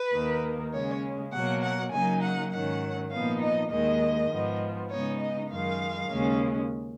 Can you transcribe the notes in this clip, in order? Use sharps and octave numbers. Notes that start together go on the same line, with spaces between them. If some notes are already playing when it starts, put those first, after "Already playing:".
Already playing: B4
D#2 D#3 A#3
C#3 G#3 C#4 C#5
B2 F#3 A#3 F#5
F#5
C#3 F#3 A#3 D#4 G#5
F#5
G#2 D#3 F#3 C#4 F#5
A#2 F3 B3 D#4 F5
D#5
D#2 D#3 G#3 D#5
G#2 F3 B3
C#3 G#3 B3 D#4 C#5
D#5
F#2 D#3 G#3 F5
D#2 C#3 G#3 C#4